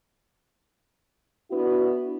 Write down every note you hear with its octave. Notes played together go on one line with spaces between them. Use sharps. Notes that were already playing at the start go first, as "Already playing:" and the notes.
B3 D4 E4 F#4